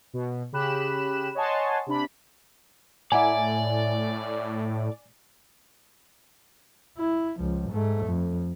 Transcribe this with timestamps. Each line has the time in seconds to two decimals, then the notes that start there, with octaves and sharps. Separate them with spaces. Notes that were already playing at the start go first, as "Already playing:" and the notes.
0.13 B2
0.52 C#3 G4 B5 F#6 E7
1.35 C#5 D#5 F#5 G#5 A5 C6
1.86 C3 D4 B5
3.12 A2 E4 D5 F#5 G#5 A#5
6.98 E4
7.40 C#2 F3
7.70 G#2 A3
8.05 F2